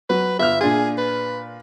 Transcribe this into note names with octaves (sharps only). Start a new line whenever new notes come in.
F#3 B4
G1 E5 F6
A#2 D4 F4 G#4
B4